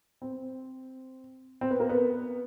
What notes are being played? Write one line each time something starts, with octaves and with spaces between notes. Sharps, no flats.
C4
C4
B3
A#3
B3